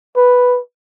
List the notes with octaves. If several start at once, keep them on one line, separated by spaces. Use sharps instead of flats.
B4